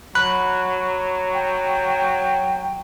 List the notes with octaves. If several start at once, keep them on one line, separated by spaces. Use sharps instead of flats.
F#3 B5 F#6
G5